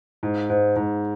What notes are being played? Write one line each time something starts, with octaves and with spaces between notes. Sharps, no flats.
G#2
G#2
G#2